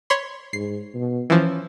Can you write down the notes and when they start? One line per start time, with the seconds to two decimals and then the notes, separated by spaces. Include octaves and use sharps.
0.10 C#5 B5 C6
0.53 G#2 C7
0.94 B2
1.30 E3 F3 C#4